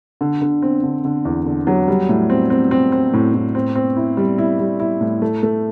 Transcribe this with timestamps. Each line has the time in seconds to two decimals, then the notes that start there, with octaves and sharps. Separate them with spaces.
0.21 D3
0.41 D3
0.62 C4
0.83 D3
1.05 D3
1.25 E2
1.46 D3
1.67 F#3
1.88 G3
2.09 A2
2.30 C4
2.50 C4
2.71 C4
2.92 C4
3.13 A2
3.34 A2
3.55 C4
3.75 C4
3.97 E4
4.17 G3
4.38 E4
4.59 G3
4.80 E4
5.01 A2
5.22 A3
5.43 A3